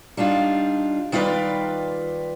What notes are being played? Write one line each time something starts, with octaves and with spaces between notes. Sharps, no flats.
G3 D4 D#4 F4
D#3 G3 F4 A4 B4 D5